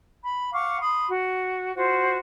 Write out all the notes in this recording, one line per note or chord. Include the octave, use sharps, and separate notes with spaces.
B5
F5 F#5 C#6 D6
B5 C6 D#6
F#4
F4 F#4 C5